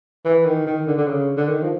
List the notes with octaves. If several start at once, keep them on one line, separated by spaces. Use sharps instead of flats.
E3
D#3
D#3
D3
D3
C#3
D3
D#3
F3